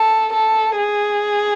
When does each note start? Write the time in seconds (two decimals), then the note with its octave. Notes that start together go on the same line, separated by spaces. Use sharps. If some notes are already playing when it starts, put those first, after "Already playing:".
Already playing: A4
0.33 A4
0.78 G#4